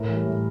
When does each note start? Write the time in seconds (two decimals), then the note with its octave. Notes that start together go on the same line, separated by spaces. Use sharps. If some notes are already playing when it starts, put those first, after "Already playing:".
Already playing: A2 A#4
0.08 E3 G3
0.27 A2